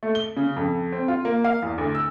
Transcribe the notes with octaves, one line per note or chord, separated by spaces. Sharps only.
A3
G7
C#3
F2
C4
F4
A#3
F5
E2
D2
E6